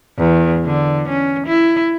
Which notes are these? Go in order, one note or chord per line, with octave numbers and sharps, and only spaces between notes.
E2
D3
C#4
E4